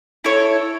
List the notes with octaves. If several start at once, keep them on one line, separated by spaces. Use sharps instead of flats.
E4 A4 C#5